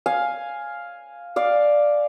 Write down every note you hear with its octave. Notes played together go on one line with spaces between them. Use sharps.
F5 G#5
D5 F5